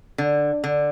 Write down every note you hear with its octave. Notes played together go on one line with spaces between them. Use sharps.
D3
D3